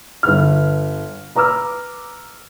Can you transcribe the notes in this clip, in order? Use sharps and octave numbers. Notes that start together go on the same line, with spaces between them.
G1 B4 F6
B4 A#5 D6 E6 F6